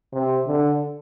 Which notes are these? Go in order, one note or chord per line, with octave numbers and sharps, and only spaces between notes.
C3
D3